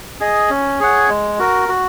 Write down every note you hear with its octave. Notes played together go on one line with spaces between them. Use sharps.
G#4 D#5
C#4
G#4 C#5 F#5
G#3
F#4 A#4
F#4